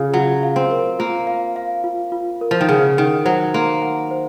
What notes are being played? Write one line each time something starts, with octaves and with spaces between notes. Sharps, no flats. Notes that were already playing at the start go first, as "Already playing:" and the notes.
Already playing: C#3 F4 F5
F#3 F4
F5
C4
A#4
A#3 F4
F5
F5
F4
F4
A#4
F3
D#3
C#3 F#5
D#3 F#5
F#3 C5
A#3 C6
F#5
C5